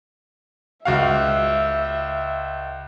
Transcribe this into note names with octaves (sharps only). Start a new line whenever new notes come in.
C#2 F#4 E5 F5